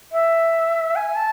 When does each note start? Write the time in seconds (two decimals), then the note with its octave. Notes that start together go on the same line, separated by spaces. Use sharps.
0.12 E5
0.96 G#5
1.16 A5